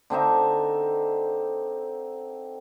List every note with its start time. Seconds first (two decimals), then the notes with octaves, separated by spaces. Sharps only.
0.10 D3 C4 D#4 E5